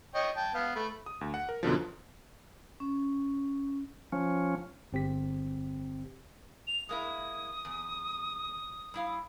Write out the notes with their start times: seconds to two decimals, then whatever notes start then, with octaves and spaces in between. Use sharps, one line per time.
0.15 C#5 D#5 G5
0.36 G5 A5
0.54 B3 F5
0.75 A3 B5
1.06 D#6
1.21 D2
1.34 F#5
1.49 A#4
1.63 F#2 B2 D3 F3
2.80 C#4
4.12 F3 C#4
4.93 G1 C4 G4 B6
6.67 F7
6.89 G#3 A#3 E4 D#6
7.65 E2
8.94 G3 E4 F5